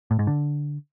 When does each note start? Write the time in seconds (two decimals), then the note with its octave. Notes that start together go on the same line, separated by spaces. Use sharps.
0.11 A2
0.19 G#2
0.27 D3